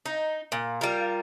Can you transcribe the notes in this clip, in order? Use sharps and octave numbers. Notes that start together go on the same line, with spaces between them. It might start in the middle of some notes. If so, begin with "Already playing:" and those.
D#4
A#2
G3 F4 A#4